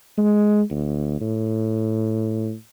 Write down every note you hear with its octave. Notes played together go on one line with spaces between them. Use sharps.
G#3
D2
A2